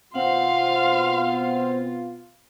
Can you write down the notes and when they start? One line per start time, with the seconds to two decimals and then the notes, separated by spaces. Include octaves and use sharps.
0.15 B2 B3 C4 F4 F5 F#5 C6